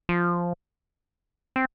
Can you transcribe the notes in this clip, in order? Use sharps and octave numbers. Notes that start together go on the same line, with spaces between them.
F3
C4